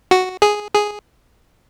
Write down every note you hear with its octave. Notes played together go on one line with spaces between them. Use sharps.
F#4
G#4
G#4